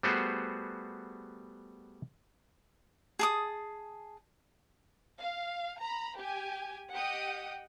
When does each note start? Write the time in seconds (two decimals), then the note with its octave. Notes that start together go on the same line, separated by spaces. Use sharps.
0.03 G3 A3 B3 F#4 G#4 C5
3.19 G#4 A5 D#6
5.18 F5
5.79 A#5 B5
6.16 G4 G#5
6.93 G4 D#5 F#5 G5 D#6